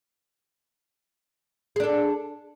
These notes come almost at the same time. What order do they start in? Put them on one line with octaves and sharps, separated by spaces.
G#4 D4 A4